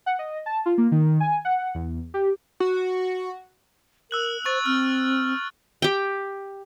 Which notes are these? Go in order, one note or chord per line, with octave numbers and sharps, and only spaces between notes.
F#5
D#5
A5
F4
A#3
D#3
G#5
F#5
E2
G4
F#4
A#4 E6 F#6 F#7
C5 C#6 A6
C4 F6
G4 G5